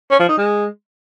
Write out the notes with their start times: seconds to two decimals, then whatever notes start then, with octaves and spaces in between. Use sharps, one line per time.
0.11 C#4
0.20 F3
0.29 D#4
0.38 G#3